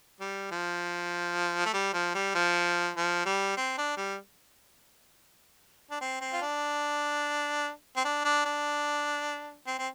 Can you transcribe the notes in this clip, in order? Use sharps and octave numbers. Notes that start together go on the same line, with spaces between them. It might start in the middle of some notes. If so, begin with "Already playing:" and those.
G3
F3
A3
G3
F3
G3
F3
F3
G3
C4
D4
G3
D4
C4
C4
F4
D4
C4
D4
D4
D4
C4
C4